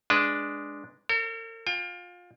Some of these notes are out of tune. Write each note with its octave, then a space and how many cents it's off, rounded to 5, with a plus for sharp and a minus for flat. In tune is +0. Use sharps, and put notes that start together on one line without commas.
G#3 +0 D4 +0 B4 +0
A#4 -45 C#5 -45
F4 +25 G5 +40